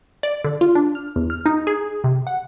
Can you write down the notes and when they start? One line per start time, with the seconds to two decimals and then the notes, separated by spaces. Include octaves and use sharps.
0.23 D5
0.44 D3
0.61 F4
0.75 D4
0.95 F6
1.16 E2
1.30 F6
1.46 D#4
1.67 G#4
2.04 C3
2.27 F#5